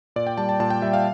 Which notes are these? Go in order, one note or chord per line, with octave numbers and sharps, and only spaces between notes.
A#2 D5
G5
G3 A5
A5
A#2 A5
G5
G3 E5
F5